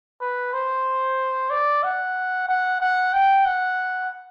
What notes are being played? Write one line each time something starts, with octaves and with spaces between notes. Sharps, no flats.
B4
C5
D5
F#5
F#5
F#5
G5
F#5